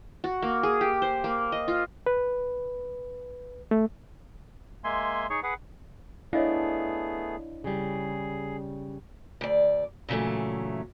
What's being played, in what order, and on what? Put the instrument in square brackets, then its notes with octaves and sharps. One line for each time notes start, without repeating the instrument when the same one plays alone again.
[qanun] F#4
A#3
G#4
G4
C5
A#3
D#5
F4
[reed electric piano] B4
A3
[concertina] G#3 A#3 E5 G#5 C6
D#4 G#4 C#5 C#6
G#4 B4 F#5
[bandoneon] A3 B3 G#4 [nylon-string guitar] D4 [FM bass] E4 [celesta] C#5 D#5 F5
[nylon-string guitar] C#3 G3 [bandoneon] G#4
[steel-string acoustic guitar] D2 D5
A#2 C#3 E3 F#3 A3